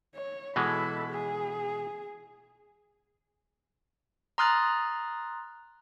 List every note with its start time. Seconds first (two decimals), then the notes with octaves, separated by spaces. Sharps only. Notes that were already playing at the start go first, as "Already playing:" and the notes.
0.14 C#5
0.56 B2 E3 G#3 A4 B5
1.11 G#4
4.38 A#5 C6 D#6 F6 F#6 A6